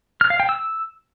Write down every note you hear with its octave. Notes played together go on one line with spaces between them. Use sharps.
F6
F5
G5
E6